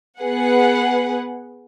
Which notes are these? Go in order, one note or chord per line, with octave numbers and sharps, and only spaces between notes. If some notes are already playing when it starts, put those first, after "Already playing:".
B3 G#4 B4 F#5